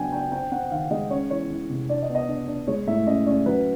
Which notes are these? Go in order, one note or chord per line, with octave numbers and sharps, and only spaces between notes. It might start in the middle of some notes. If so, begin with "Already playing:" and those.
Already playing: F#3 B3 D4 G5 G#5
D4 G5
C4 G5
C4 F#5
D#3 F5
G#3 D#5
C#4 C#5
E3 C#5
E3
C3
D4 D5
D#5
B3
D#5
D4
D4
G#3 C#5
A2 E5
C#4 D#5
C#4 D5
F#3 B4